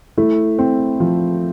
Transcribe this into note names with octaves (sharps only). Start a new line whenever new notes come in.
A3 E4
C4
F3